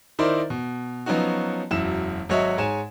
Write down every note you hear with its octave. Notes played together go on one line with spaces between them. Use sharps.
D#3 D#4 E4 A#4 C5 D5
B2
F3 F#3 B3 C#4 D#4 F#4
E1 F#2 E4 E7
G#1 F#3 F#4 C#5 D#5 E5
G#2 C#5 G#5 E7